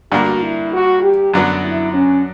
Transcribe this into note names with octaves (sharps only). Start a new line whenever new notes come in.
G2 D3 A#3 F#4
E4
F#4
G4
F#2 D3 F#3 B3
E4
C#4